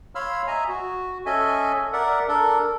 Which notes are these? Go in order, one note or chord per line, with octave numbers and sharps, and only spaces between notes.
C#5 F5 B5 C6 E6 F6
D#5 E5 G#5 A#5
F#4
C#4 A4 D#5 E5 G#5
A#4 D5 E5 F#5
D4 A4 A#4